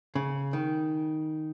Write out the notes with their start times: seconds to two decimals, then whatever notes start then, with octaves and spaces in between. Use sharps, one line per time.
0.15 C#3
0.53 D#3